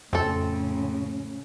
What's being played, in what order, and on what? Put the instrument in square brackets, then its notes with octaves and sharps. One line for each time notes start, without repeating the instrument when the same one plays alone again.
[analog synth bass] F2 [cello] A2 C#3 [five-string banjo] C4 A4